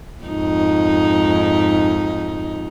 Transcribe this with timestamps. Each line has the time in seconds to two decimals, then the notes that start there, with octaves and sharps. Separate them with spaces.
0.24 F2 G#2 D#4